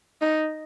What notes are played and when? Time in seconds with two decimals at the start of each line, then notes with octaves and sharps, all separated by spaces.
0.21 D#4